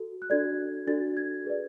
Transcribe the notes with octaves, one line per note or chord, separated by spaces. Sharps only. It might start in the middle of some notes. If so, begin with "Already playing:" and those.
Already playing: F#4 A4
F#6
D4 F#4 A4 D5 G#6
D4 F#4 A4 D5 A6
G#6
G#4 B4 D5